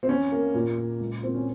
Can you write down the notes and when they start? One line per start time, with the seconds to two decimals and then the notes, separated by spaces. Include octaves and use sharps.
0.03 C4
0.09 E2 C#4
0.32 A#3
0.54 A#2
0.77 A#2
1.00 C#2
1.23 A#3 C4
1.34 C#4